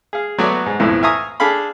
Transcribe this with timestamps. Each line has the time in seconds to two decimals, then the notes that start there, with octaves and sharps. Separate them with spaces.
0.13 G#4 F5
0.38 F#3 A3 B3 F#4 C#5 D5
0.66 G#2
0.79 B1 F2 A2 E3
1.03 E5 F5 G#5 A#5 C#6 D#6
1.40 D4 G#4 A4 F5 B5